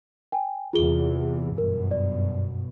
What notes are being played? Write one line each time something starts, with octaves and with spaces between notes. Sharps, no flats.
G5 G#5
E2 C3 E3 F4 G#4 G7
G1 F#2 B2 A#4
D5